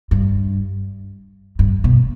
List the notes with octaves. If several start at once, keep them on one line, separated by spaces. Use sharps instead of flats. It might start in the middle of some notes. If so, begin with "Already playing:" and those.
G2
G2
B2